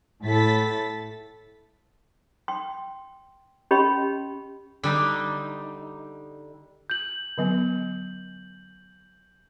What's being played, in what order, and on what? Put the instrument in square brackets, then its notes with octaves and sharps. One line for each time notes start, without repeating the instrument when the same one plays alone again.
[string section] A2 E4 A4 A6 B6
[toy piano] G5 C6
C#4 G4 D#5 B5 C6
[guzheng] D3 G3 D#4
[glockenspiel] G6 F#7
[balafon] D3 F#3 B3